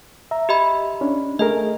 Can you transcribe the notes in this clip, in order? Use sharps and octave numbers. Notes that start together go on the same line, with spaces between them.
E5 A#5
G4 D#5 B5
C#4 D4
A3 G#4 A#4 D#5